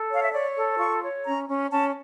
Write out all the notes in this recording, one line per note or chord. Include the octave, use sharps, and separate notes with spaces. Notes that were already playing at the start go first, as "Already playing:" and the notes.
Already playing: A4
C#5 F5
E5
C#5 D5
A4
F4 C#6
C#5
C#4 A#5
C#4
C#4 A5